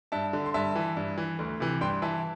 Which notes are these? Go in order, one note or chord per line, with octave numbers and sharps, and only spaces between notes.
G2 E5 A5
D3
C6
G2 E5 A5
E3
G2
E3
D2
C3 E3
G2 G5 C6
E3 E5 A5